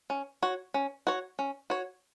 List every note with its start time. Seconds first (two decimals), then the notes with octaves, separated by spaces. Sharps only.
0.10 C#4
0.42 F#4 C#5
0.74 C#4
1.07 F#4 C#5
1.39 C#4
1.70 F#4 C#5